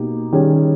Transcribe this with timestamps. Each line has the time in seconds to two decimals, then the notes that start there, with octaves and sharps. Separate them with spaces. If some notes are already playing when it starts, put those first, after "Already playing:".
Already playing: B2 A#3 D#4 G4
0.32 D#3 G3 C#4 G#4